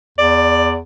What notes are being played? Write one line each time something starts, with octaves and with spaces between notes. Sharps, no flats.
E2 D5